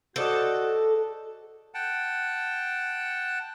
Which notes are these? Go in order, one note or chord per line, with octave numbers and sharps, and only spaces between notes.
F#4 A4 C5 D5 D#5
F#5 G5 A5